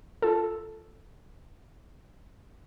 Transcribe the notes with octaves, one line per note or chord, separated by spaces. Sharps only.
F4 A4